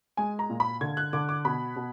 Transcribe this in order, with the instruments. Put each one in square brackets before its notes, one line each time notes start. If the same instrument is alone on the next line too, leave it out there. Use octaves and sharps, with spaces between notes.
[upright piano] G#3 G#5
A#5
A#2
B5
D3 G#6
F#6
D3 D6
D6
B2 B5
B2